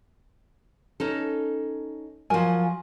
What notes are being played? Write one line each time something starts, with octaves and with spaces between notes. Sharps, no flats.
C#4 D#4 A4
F3 F#3 A#4 G#5